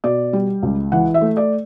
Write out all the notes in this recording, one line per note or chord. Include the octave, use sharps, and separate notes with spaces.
B2 D5
G3
C#2
E3 F#5
E5
A3
D5